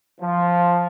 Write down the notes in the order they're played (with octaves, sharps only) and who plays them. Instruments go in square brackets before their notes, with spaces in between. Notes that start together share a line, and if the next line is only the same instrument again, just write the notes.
[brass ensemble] F3